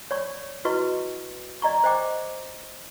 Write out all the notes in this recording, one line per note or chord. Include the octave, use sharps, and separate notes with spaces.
C#5 D5 C#6
E4 F#4 B4 D#5 C#6
D5 D#5 A#5 C#6
C5 D#5 G5 D6